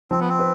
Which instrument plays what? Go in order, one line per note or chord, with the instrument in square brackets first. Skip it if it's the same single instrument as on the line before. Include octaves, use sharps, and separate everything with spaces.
[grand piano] F3 [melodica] C4
[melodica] B3
C4
[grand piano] B4